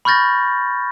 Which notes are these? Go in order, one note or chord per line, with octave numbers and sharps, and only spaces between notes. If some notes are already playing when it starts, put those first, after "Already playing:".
B5 C#6 F6 G6 A6 A#6